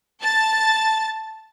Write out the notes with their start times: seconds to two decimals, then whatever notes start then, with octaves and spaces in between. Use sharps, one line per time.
0.22 A5 A6